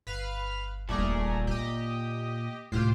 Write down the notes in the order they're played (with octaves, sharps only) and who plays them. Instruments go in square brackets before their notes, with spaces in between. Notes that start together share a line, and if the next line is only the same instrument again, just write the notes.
[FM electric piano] G1 [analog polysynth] B4 F5 F6
[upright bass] D#1 D3 [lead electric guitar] A#2 D5 [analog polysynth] A3 G#4 A#4
[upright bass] A#3 [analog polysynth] G4 D#5
[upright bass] C#2 C3 [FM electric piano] A2 [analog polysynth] F4 G4 C5